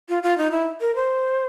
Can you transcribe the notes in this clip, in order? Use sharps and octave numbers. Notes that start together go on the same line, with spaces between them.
F4
F4
D#4
E4
A#4
C5